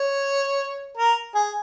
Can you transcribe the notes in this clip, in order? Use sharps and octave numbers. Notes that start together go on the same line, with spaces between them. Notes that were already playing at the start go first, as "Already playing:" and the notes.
Already playing: C#5
A#4
G#4